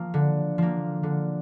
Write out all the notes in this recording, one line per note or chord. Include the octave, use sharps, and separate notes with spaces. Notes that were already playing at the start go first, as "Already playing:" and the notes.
Already playing: F3 A#3
D3
F3 A#3
D3